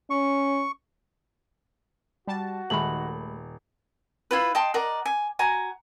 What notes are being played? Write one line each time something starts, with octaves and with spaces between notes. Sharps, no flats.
C#4 C#6
G3 F#4 A5
D#1 D#3 G#3 A3 B5 F#7
E4 F4 B4
D#5 G5 A5 C6
A#4 D5 D#5 F#5
G#5
F#4 G#5 A#5